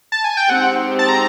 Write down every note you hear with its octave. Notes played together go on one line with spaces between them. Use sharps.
A5
G#5
G5
G#3 C4 D#4 G4 C5 F#5
A5
A#5